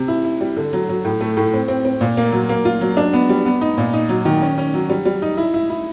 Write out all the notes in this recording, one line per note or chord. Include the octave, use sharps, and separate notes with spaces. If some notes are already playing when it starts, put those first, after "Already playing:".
Already playing: C3
E4
E4
G3
D3
F#3
F#3
A2
A3
A2
C4
C4
C4
A#2
A#3
F#3
A#3
F4
F#3
D4
B3
G3
B3
D#4
A#2
D#4
F#3
D#3
C#4
C#4
F#3
G3
G3
D#4
E4
E4
E4